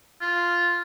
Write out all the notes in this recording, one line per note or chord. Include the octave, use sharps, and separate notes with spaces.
F4